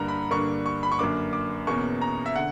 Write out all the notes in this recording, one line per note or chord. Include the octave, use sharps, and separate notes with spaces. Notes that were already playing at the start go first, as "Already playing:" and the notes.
Already playing: G2 D3 A#3 D4 A#5
B5
G2 D3 A#3 D4 C#6
C#6
B5
C#6
F#2 D3 A#3 D4 D6
D6
E2 B2 A#3 C#4 C#6
A#5
E5
D3 F#5